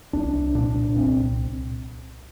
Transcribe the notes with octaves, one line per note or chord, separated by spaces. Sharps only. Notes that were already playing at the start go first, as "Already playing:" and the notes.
C2 D4
A#2 D4
C2 C4